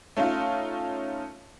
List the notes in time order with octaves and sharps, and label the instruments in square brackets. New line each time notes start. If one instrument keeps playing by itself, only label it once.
[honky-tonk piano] A3 C#4 D#4 F4